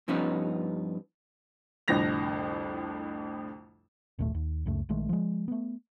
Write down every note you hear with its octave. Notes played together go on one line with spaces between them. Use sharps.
G2 F3 B3 C#4 D#4
C2 F2 A2 D3 A#6 F7
G#1 D#2 A#2 A3
D#2
C#2 F#2 C#3 A3
A#1 D#3 G#3 A3
F3 G#3
A3 B3